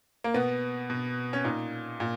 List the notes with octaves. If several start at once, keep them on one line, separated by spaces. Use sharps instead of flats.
A#3
B2 B3
B2
C#4
A#2 D#4
A#2